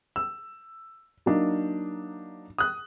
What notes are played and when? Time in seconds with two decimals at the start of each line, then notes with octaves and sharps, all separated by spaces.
0.16 E6
1.26 F#3 A#3 D4 D#4
2.58 D#6 F#6